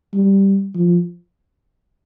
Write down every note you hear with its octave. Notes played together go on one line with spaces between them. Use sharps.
G3
F3